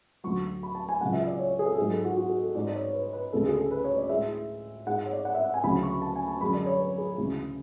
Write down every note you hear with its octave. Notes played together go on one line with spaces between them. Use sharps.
D2 D3 F#3 C#6
B5
A5
G#5
C#2 C#3 F#3 F#5
E5
D5
C#5
G#4
A4
G#2 F#3 G#4
A4
F#4
F#4
G#4
A4
G#2 G#3 D5
D5
C#5
C#5
B4
B4
D2 C#3 G#3 A4
G#4
A4
B4
C#5
D5
A2 G#3 E5
G#2 G#3 F#5
F#5
C#5
D5
F#5
E5
F#5
G#5
D2 C#3 F#3 B5
C#6
A5
G#5
A5
F#2 D3 G#3 B5
D5
C#5
B4
G#4
D2 C#3 E3 G#3